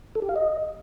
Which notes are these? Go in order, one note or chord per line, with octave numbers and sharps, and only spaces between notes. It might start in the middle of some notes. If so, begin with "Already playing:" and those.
A4
G4
F5
D#5